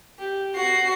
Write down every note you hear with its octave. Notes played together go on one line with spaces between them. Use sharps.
G4
F#4 C7